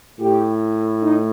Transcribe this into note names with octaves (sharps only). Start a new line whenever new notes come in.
A2 G4
D#4